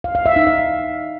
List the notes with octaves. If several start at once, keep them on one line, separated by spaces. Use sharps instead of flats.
F5
F5
E5
D#4
F5